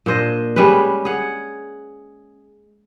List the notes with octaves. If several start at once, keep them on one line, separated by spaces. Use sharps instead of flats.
A#2 D4 C5 D#5
G3 G#3 C#4 B4
G#4 F#5